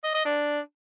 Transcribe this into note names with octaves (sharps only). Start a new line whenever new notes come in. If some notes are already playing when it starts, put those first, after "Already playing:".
D#5
D#5
D4